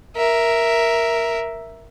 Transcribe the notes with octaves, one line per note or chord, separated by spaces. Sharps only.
A#4 E5